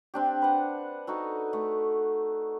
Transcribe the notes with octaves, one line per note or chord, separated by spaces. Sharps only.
C4 D4 G4
B4 F#5
D#4 F#4 A4
A3